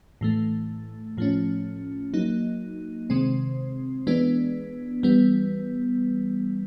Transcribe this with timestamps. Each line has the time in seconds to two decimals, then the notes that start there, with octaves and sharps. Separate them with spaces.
0.21 A2 E3 A3
1.17 A2 F3 A3 C#4
2.14 F#3 A#3 D#4
3.10 C3 D#3 G#3 C4
4.07 E3 G#3 B3 D4
5.03 E3 G3 B3